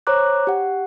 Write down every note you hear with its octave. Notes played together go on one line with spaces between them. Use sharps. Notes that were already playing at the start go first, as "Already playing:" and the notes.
C5 C#5 A#5 D6 F#6
G4 F#5